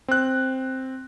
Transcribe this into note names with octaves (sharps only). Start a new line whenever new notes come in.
C4 F#6